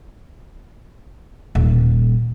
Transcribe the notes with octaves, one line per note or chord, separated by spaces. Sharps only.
D#1 G3